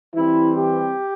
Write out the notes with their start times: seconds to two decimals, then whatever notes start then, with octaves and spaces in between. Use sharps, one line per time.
0.14 E3 G3 C4 E4
0.55 G4